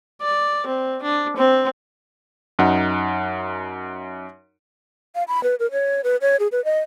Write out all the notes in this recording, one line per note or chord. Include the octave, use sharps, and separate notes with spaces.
D5
C4
D4
C4
F#2 D#4 F#5
F5
B5
B4
A#4
C#5
B4
C#5
G#4
B4
D#5